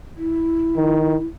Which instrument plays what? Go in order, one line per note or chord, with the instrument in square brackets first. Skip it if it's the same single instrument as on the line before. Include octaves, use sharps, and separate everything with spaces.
[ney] E4
[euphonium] D#3